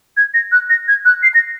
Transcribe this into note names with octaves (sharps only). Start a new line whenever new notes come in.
G#6
A#6
F#6
A#6
G#6
F#6
C7
A#6